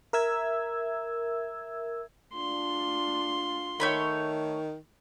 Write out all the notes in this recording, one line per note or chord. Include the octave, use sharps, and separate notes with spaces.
A#4 E5 E6 G#6
D4 F4 C6
D#3 A3 C#5 B5